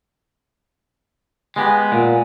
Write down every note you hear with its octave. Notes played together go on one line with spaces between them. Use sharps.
G#3 B3 G4 G#5
A#2